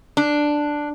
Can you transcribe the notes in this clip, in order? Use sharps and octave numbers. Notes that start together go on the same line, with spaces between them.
D4